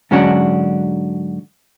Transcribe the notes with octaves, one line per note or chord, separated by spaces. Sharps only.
G#2 D3 F#3 C#4 D4 F#4